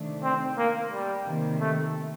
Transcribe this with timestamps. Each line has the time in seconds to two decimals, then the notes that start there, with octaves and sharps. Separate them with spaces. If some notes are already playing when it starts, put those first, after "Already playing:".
Already playing: C3 D#3 A3 D4
0.23 C4
0.58 A#3
0.92 G3
1.26 C3 D#3 A#3
1.60 A3